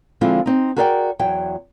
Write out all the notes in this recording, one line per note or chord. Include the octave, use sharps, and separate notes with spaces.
D3 F3 G#3 C4 E4 F4
C4 D#4
F#4 G#4 A#4 D5 E5 G5
E2 F#3 G5